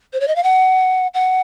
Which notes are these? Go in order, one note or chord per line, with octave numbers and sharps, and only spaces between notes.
C5
C#5
D#5
F5
F#5
F#5